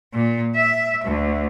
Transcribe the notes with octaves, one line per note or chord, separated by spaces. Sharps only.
A#2
E5
D2